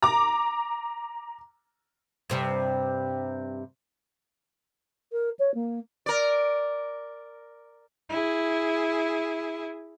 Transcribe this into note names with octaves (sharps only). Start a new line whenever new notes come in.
A#5 D6
G2 C3 G3
A#4
C#5
A#3
A#4 D5
E4 G#4